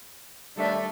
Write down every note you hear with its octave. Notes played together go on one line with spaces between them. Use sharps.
D#2 G3 A3 D4 A4 D5 E5